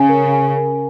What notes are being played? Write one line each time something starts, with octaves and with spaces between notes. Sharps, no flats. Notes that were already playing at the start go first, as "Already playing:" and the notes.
Already playing: C#3 G#5
A#4
G#5
A#4